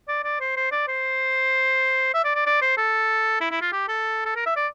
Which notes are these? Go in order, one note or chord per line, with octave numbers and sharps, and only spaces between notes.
D5
D5
C5
C5
D5
C5
E5
D5
D5
D5
C5
A4
E4
E4
F4
G4
A4
A4
A#4
E5
D5